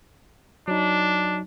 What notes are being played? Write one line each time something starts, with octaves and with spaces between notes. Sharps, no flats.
F#3 D4 D#4